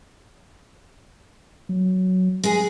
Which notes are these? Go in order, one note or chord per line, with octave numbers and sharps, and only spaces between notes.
F#3
G#3 G#4